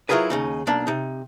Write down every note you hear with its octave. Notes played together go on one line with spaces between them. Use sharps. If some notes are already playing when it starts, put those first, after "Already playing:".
F#3 E4 F4 G#4 A#4 B4
D#2 C#3 D#4
B1 A#3 D4 B5
C3 D#4